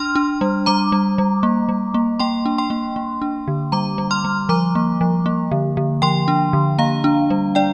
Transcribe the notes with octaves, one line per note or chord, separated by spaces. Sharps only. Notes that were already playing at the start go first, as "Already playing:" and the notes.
Already playing: D4 C6 F6
D4
G3
G3 A#5 D6
G3
G3
A#3
G3
A#3
A#3 G5 C6
D4
G5 C6
A#3
A#3
D4
D3
G3 A#5 D6
G3
C6 F6
G3
F3 A#5 D6
A#3
F3
A#3
D3
D3
F3 G5 C6
D4
D3
A#3 F5 A#5
D4
G3
D4 D5 G5